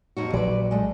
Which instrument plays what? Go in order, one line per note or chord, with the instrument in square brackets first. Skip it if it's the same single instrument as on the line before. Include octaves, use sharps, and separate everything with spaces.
[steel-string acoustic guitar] F2 D#4 F#4
[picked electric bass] A#1 F#3 [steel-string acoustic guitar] B4 D5
[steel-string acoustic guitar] G#3 A3